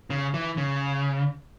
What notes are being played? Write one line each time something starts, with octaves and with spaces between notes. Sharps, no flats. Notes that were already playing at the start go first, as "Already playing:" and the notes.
C#3
E3
C#3